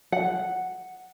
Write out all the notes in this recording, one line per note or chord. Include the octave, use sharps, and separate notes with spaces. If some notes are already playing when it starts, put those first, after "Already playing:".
F#5